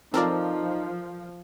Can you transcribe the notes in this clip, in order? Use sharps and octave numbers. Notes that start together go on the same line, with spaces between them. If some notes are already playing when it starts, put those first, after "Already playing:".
F3 C4 D#4 F4 A4 A#4 D5